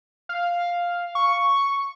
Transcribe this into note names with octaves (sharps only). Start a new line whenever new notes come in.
F5
C#6